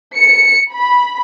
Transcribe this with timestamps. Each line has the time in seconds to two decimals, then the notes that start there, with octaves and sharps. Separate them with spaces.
0.16 C#7
0.73 B5